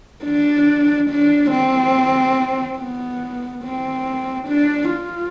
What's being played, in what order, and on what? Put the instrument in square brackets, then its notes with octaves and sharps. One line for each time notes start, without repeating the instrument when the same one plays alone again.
[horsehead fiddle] D4
D4
C4
B3
C4
D4
F4